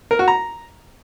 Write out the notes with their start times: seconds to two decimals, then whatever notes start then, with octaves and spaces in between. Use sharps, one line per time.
0.11 A#4
0.19 F#4
0.28 A#5